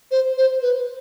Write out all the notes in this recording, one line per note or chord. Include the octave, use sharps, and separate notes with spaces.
C5
C5
B4